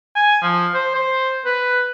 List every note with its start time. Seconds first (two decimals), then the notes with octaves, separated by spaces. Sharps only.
0.16 G#5
0.42 F3
0.74 C5
0.95 C5
1.45 B4